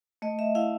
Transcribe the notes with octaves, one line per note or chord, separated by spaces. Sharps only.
A3 D#5
E5
E4 F5